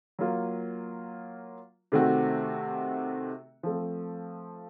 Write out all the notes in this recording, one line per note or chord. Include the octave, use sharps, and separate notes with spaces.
F#3 A#3 F4
C3 D#3 A3 C4 F#4
F3 A3 C4